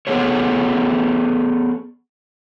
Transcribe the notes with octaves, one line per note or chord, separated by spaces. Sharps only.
B3 G#4 A4 C#5